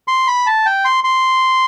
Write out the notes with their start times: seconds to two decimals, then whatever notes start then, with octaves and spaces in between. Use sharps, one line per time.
0.08 C6
0.27 B5
0.46 A5
0.66 G5
0.85 C6
1.04 C6